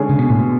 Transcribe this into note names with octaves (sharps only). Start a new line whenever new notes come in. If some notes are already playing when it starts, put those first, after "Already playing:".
Already playing: D3 G#3 C#4 G#4
C#3
B2
A2
B2